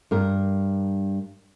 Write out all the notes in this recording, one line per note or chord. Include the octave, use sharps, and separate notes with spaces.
G2 A#4